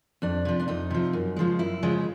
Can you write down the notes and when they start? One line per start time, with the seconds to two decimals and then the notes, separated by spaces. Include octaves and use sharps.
0.22 F2 D4
0.45 C3 F3
0.60 D4
0.68 F2 D#4
0.90 C3 F3
1.13 F#2
1.36 C#3 F3 G#3
1.59 F#2 E4
1.83 C#3 F3 G#3